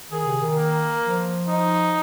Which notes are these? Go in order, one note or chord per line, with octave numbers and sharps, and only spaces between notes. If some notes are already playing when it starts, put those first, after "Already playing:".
D#3 G#4
C3
D#3
A#3
F3
D#4